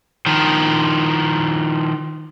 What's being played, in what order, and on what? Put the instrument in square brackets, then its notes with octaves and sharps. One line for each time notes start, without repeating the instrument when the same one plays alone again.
[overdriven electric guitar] D#3 F3